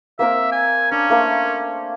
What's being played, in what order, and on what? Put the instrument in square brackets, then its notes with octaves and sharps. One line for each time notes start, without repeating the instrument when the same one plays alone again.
[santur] A#3 C4 A#4 [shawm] E5
[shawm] G#5
[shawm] C#4 [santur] D4
[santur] A3 A#3 C5